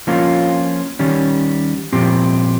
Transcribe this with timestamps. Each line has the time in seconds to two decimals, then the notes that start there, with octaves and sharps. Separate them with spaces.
0.07 F3 A#3 C#4 F4
0.99 D#3 G3 C#4
1.93 A#2 F3 C4 G4